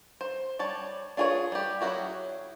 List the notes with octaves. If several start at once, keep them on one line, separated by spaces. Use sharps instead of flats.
C5
G3 C#5 A5
D4 F4 G#4 B4 C#5
G3 G4
F#3 C#4 E4 F#4 G#4